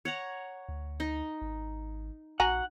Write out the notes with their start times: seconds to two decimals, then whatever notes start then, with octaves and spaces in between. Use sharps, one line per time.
0.05 C#5 F#5 A#5
0.69 D2
1.00 D#4
1.42 G#1
2.40 A#1 F#4 F#5 G#5 A#5